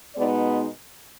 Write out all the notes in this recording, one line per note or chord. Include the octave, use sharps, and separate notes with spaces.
B2 G#3 B3 D#4 D5